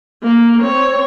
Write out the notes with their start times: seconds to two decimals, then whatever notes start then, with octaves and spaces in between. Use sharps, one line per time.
0.23 A#3
0.61 C4 C#5